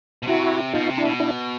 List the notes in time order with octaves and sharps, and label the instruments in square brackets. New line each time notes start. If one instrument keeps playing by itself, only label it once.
[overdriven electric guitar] B2
[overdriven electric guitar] C3 [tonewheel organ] E4 F#4
[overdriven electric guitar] B2 [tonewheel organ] D#4 F4
[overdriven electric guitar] C3
[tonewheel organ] D4 E4
[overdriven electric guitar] B2
[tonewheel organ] D4 E4